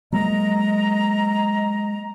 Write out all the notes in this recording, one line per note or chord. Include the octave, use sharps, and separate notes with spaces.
F#3 G#3 A#3 D#5 A#5